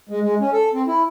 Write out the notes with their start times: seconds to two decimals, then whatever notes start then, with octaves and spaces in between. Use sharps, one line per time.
0.09 G#3
0.22 G#3
0.40 C#4
0.53 A4
0.74 C4
0.87 E4